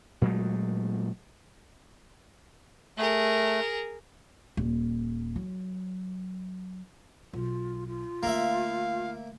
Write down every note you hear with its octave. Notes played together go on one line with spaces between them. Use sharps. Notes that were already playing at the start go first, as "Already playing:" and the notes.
A#2 F#3 G#3 A3
A3 G#4 A#4
D#1
F#3
B1 F4
F4
D3 A3 A#3 E5 F5